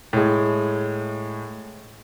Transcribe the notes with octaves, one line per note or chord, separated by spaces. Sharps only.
A2 G#3